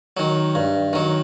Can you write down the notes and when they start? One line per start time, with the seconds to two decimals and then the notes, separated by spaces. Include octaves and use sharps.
0.17 D#3 F#3
0.55 G2
0.93 D#3 F#3